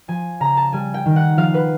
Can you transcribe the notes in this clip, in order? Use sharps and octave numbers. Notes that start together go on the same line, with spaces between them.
F3 G#5
C#3 A#5
A5
G3 G#5
G5
D#3
F#5
F3 F5
B4